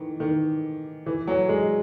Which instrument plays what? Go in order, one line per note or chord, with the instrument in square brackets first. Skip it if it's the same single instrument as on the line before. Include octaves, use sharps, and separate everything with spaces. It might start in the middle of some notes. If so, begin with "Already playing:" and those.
Already playing: [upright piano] D#3 E3
D#3
E3
F#3
G#3